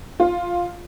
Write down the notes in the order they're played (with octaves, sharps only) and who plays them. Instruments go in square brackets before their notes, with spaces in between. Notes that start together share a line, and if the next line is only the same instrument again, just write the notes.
[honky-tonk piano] F4